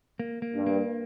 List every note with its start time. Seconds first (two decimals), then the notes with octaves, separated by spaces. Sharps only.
0.20 A#3
0.42 A#3
0.55 G2
0.66 A#3